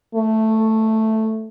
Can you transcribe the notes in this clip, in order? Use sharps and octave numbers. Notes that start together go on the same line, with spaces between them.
A3